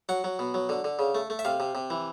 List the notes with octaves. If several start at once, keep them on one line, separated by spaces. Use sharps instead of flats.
F#3 F#5
F#3
B2
F#3
D3
D3
C#3
A3
A3
E5
C3 F5
C3
C3
E3